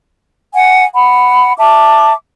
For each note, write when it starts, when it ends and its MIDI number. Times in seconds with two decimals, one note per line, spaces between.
0.54 0.84 78
0.54 0.84 80
0.94 1.52 78
0.94 1.52 83
1.58 2.13 76
1.58 2.13 81
1.58 2.13 86